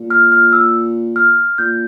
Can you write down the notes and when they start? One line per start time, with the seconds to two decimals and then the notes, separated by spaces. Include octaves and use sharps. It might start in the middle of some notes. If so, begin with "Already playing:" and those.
Already playing: A#2
0.10 F6
0.32 F6
0.53 E6
1.16 F6
1.58 A#2 G6